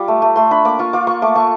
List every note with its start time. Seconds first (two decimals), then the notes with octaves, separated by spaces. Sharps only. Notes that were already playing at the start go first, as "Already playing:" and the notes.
Already playing: G3 F4 D6
0.08 A3
0.22 A3
0.36 A3 C6
0.51 D4 B5
0.65 A#3 D6
0.79 F4 C#6
0.93 F4 D6
1.07 A#3 C#6
1.22 A3 D6
1.35 A3 C#6